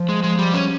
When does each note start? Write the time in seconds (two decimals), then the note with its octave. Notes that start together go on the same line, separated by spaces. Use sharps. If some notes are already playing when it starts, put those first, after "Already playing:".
Already playing: F3
0.09 G#3
0.23 G#3
0.39 G3
0.54 C#4